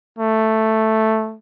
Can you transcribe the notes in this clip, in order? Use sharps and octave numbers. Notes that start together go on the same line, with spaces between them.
A3